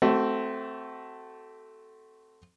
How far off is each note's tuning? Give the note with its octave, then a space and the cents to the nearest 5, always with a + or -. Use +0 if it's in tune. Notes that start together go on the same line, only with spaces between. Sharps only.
A3 +0 C4 -5 F#4 +30